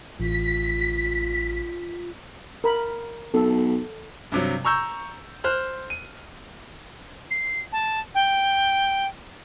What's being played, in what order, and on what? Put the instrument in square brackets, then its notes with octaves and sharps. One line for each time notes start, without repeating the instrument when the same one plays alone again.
[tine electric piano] A1 [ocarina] F4 [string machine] B6
[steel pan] A#4 B5
[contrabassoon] B1 [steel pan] A4
[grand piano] G2 C3 F#3
A#5 C#6 E6 G6
C5 F6 F#6
D#7
[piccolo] C7
A5
G5